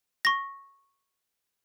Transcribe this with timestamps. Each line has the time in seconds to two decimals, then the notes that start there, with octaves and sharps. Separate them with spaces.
0.25 C#6 A#6